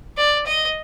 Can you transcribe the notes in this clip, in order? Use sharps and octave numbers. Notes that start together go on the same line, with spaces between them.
D5
D#5